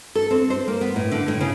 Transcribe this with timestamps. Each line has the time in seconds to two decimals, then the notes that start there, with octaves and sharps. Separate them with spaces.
0.15 A4
0.31 C4
0.50 C5
0.68 A#3
0.81 B3
0.96 A2
1.12 D3
1.28 A2
1.41 C#3